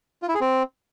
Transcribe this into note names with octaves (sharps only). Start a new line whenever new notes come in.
F4
E4
G#4
C4